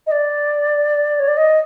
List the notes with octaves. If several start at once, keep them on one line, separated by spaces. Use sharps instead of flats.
D#5
D5
C#5
D5
D#5